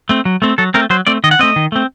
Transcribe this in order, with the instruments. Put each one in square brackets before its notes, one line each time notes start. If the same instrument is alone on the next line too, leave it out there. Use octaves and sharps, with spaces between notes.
[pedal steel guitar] A3 C4
F#3
A3 C4
F#3 A4
A3 C4 A#4
F#3 C5
A3 C4 D5
D#3 D#5
F#5
A3 C4 D#5
D#3
A3 C4